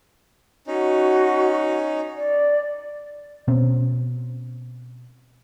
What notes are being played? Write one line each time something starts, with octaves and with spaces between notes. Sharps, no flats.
C#4 D#4 F#4
D5
B2 C4 C#4